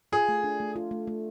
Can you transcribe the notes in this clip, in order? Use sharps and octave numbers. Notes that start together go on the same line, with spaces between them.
F4 G#4
A3
D4
A3
F4
A3
A3